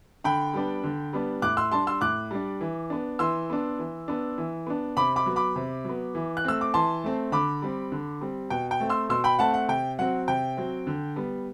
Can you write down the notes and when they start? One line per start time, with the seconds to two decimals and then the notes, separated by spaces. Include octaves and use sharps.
0.24 D3 G5 B5
0.53 G3 B3 D4
0.84 D3
1.13 G3 B3 D4
1.42 A2 D6 F#6
1.57 C6 E6
1.71 G3 D4 A5 C6
1.87 C6 E6
2.01 A2 D6 F#6
2.31 G3 D4
2.61 E3
2.90 B3 D4
3.19 E3 C6 E6
3.50 B3 D4
3.79 E3
4.08 B3 D4
4.38 E3
4.67 B3 D4
4.97 C3 B5 D6
5.16 B5 D6
5.26 F#3 B3
5.36 B5 D6
5.56 C3
5.85 F#3 B3
6.15 E3
6.37 F#6
6.45 A3 C4 E6
6.61 D6
6.74 E3 A5 C6
7.04 A3 C4
7.32 D3 B5 D6
7.62 G3 C4
7.92 D3
8.21 G3 C4
8.50 B2 G5
8.71 G5
8.80 A3 C4
8.89 C6 E6
9.09 B2 C6 E6
9.24 G5 B5
9.39 A3 C4 F#5 A5
9.54 F#5
9.68 C3 G5
9.99 F#3 C4 F#5
10.28 C3 G5
10.57 F#3 C4
10.87 D3
11.16 G3 B3